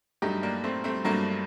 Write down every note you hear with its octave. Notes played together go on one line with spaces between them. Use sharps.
G2 F#3 A3 D#4 G4
A#3 D4
A3 C4
A3 C4
G2 F#3 A3 A#3